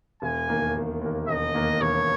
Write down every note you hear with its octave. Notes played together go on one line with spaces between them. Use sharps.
E1 G#5
D#2 D#3 A#3
E1
D#2 D#3 A#3
E1 D#5
D#2 D#3 A#3
E1 C#5